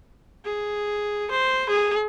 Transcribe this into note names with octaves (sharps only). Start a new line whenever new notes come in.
G#4
C5
G#4